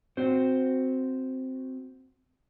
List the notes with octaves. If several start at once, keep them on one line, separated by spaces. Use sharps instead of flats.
C4 F#4 C5